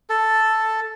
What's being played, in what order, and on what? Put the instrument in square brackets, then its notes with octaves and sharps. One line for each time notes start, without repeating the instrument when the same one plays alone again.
[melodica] A4